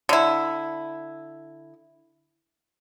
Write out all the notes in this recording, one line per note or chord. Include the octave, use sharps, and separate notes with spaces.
D3 E4